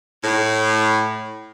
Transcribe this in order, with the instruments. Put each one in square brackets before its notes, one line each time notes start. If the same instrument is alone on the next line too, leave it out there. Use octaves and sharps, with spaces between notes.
[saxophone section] A2